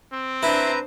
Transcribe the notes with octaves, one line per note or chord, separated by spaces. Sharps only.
C4
D4 E4 B4 C5 A#5